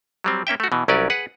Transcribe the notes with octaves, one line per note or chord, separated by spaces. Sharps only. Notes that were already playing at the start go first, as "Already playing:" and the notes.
F#3 G3 C4
A#3 C#4 E5 G5
A3 F#4
B2 E3
C2 F#3 C#4 A#4 B4 D5
G#4 B4 F#5